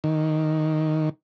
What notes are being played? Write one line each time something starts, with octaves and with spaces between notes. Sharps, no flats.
D#3